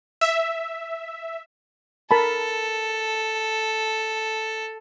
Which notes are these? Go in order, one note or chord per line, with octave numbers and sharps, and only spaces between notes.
E5
A4 A#4 A5 B5